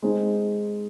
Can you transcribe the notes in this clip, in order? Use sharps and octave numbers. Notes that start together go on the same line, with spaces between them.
G#3 C4 D#4